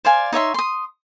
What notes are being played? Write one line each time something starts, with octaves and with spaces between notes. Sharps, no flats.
C5 D5 F5 G#5
D#4 C#5 E5 C6
C6 D#6